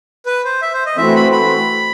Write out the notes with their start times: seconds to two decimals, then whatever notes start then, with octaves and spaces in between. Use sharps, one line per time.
0.26 B4
0.45 C5
0.62 E5
0.73 C5
0.86 D#5
0.97 E3 A3 C4 F#4 E5
1.16 B5
1.32 B5